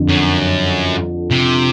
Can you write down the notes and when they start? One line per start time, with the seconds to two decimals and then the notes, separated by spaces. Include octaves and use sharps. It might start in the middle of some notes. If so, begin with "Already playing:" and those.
Already playing: F2 D3 F3
0.08 F#2
1.31 C3